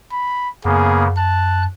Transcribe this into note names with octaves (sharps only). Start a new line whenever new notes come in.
B5
F#2 C#3 A#3 B3 G#4
A5 F#6